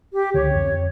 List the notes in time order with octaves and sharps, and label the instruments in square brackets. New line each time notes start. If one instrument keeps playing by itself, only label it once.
[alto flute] G4
[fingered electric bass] C#2 D3 [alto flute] C#5
[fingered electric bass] F2 C#4